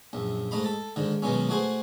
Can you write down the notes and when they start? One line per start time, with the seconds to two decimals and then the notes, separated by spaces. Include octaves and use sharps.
0.13 A#1 F#2
0.51 G#2 A3 D#5 A#5 B5
0.64 A4 A5
0.96 G#2 D3 D#3
1.22 B2 D#3 F#3 G#3 B3 C#4
1.49 A3 F#4 G#4 C5